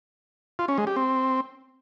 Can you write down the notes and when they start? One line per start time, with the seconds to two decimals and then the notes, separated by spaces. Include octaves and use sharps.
0.59 F4
0.68 C#4
0.78 G#3
0.87 G4
0.96 C4